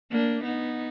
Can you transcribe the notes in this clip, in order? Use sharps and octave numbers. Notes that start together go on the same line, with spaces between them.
A#3 D4
B3 D#4